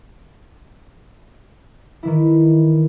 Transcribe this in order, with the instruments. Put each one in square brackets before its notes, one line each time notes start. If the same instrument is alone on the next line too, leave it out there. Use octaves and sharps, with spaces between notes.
[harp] D#3 E3 E4